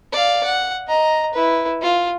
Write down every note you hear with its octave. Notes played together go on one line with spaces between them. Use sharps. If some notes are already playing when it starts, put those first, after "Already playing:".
D5 F5
F#5
D#5 A#5
E4 B4
F4